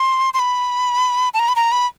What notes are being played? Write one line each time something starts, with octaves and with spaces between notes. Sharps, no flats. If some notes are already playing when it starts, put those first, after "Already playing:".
Already playing: C6
C6
B5
A5
A#5
B5
A#5
B5